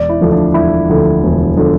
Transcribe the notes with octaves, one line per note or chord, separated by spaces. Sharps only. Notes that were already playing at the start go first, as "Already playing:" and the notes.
Already playing: E1 D5
E4
D2 D3 F3
D4
E1 E4
D2 D3 F3
E1
D3 F3